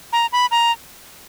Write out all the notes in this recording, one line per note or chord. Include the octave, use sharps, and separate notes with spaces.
A#5
B5
A#5